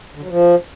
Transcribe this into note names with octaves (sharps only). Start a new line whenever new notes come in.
D3
F#3
F3